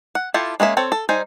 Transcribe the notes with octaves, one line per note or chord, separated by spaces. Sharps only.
F#5
E4 F4 G4 A4
G#3 A#3 C#4 E5
C4 A4 C#5
A4
G3 D#4 C5 G#5